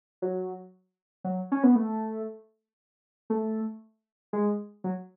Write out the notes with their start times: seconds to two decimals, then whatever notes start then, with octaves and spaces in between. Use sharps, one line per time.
0.22 F#3
1.24 F#3
1.52 C#4
1.63 B3
1.76 A3
3.30 A3
4.33 G#3
4.84 F#3